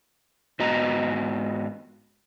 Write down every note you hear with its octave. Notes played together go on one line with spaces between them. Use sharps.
G#2 B3 F#4 D#5 A#5